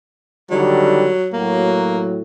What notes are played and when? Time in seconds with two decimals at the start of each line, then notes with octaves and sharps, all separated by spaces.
0.50 D3 D#3 F#3 G3
1.33 A2 F#3 A#3